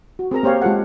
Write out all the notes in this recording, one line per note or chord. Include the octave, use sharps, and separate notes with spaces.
F#4
C4 G#4 A#4 A#5
A#3 G4 C5 C#5 F5
G#3 F4 G4 A4 F#5